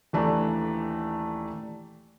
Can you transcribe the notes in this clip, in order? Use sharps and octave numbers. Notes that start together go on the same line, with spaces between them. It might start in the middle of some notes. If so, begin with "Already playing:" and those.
D#1 E3 A3 D4 A#5